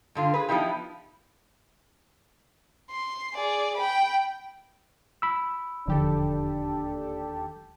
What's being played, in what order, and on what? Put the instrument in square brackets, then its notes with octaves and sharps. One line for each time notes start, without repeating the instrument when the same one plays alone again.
[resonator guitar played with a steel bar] G2 D3 F4
G#4 B4
F3 B3 D#4 E4 G4
[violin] C6
G#4 D5
G5 B5
[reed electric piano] B5 E6
[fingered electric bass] E1 D3 F3 [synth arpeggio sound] D#2 G4 A4 [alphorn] D4